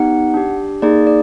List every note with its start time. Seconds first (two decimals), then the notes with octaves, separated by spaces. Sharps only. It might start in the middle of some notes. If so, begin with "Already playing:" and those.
Already playing: B3 D#4 G4 F#5
0.34 D4 G4
0.82 A#3 D#4 G#4 D5
1.07 D5